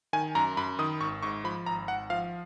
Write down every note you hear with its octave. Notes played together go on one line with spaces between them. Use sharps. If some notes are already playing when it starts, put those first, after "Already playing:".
D#3 G#5
F#2 A#5
F#2 B5
D#3 D#6
G#1 C#6
G#2 C#6
F3 B5
G#1 A#5
G#1 F#5
F3 F5